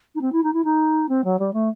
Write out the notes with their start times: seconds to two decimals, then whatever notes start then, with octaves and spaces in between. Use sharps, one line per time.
0.15 D#4
0.21 C4
0.32 E4
0.43 D#4
0.53 E4
0.64 D#4
1.09 C4
1.24 F#3
1.39 G3
1.53 A3